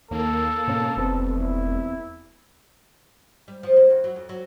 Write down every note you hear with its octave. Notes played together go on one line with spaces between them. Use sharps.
D#2 A#3 A4
G#2 B2 C#4
F1 E2 B3 C4
E4
G3
F3
A#3
E2
F#3
F2
F#3